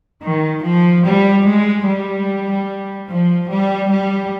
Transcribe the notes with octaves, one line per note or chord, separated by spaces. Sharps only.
D#3
F3
G3
G#3
G3
F3
G3
G3